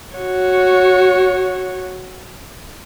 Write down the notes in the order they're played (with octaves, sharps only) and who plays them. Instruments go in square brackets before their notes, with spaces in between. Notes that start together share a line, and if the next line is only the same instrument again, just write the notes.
[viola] F#4 C#5